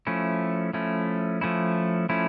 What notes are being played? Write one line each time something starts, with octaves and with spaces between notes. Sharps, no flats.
F3 A3 C#4 E4
F3 A3 C#4 E4
F3 A3 C#4 E4
F3 A3 C#4 E4